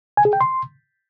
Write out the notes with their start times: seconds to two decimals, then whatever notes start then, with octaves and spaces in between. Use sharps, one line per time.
0.17 G#5
0.25 G#4
0.33 G5
0.41 C6